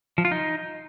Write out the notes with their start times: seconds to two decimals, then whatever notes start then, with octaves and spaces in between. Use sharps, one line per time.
0.18 F3
0.25 F4
0.31 D#4